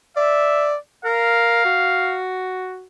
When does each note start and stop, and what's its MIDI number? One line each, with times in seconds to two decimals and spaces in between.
0.17 0.75 74
0.17 0.75 76
1.05 1.61 70
1.05 2.21 77
1.65 2.86 66